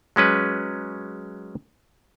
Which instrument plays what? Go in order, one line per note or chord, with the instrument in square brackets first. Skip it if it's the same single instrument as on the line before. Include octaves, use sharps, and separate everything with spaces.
[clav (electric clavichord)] F#3 G#3 C#4 B4